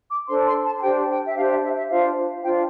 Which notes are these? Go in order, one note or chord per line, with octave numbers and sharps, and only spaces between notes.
D6
D4 A4 C5 C6
C6
A5
A5
D4 G4 C5 G5
G5
E5
D4 G4 C5 F5
E5
E5
E5
D4 F4 C5 F5
D4 F4 C5 G5